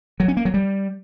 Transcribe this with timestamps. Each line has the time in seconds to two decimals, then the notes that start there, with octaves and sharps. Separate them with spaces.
0.20 F#3
0.28 C#4
0.37 A#3
0.45 F#3
0.54 G3